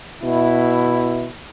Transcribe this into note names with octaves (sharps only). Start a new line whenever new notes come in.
B2 E4